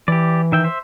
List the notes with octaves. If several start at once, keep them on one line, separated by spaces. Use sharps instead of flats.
E3 G4 D5
D#3 E5 G5
C5 E5